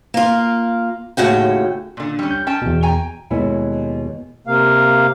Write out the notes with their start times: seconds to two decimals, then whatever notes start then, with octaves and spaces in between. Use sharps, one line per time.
0.14 A#3 F4
1.17 D#2 A2 C#3 F#4 G5
1.97 A#2 D3
2.19 G3 C#4
2.31 G6
2.47 C#4 G5 A5
2.62 E2 B2
2.83 G5 G#5 A#5
3.30 D#2 B2 G#3 E4 C#5 G#5
4.47 C3 A#3 F5